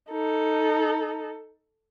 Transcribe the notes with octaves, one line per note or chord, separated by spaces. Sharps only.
D#4 A4